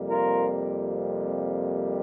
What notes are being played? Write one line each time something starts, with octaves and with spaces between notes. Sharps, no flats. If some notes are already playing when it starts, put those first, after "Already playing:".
Already playing: F2 C3 G3 A#3
F4 A#4